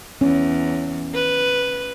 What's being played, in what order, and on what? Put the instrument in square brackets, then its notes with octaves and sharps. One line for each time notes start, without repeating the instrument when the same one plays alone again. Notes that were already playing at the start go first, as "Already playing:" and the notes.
[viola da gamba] E2 [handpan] C#4
[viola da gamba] B4